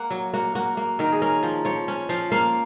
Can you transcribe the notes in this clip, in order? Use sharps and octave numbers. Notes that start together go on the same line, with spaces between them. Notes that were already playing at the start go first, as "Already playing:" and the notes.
Already playing: A#3 F#5
F#3
A#3 F#4
A#3 F#4
A#3
D#3 A#4
G#4
C#4 A#4
F3
F3 C#5
C#4
F3 F5
A#3 F5